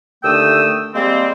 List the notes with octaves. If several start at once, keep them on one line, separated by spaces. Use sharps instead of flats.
D#2 D3 A3 G5 D#6 E6
G3 G#3 A#3 C4